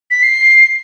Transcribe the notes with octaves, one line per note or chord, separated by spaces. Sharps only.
B6
C7